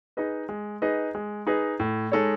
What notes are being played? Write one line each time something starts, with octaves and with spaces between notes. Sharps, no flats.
D#4 G#4 B4 D#5
G#3
D#4 G#4 B4 D#5
G#3
D#4 G#4 B4 D#5
A2
G#3 D#4 A4 C#5